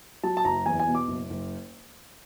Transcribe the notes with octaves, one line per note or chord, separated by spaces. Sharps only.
F#3 A5
A5
F#1 A#5
E2 G#5
G#5
B2
D6
F#1
F#1